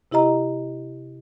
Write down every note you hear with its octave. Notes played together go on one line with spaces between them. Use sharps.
C3 E4 G4 D#5 A#5